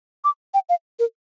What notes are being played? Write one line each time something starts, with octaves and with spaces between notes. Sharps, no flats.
D6
G5
F5
A#4